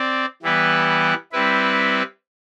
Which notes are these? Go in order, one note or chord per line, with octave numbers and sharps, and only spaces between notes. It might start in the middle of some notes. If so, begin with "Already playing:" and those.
Already playing: C4 D5
E3 G3 B3 E4 B4
G3 C4 E4 B4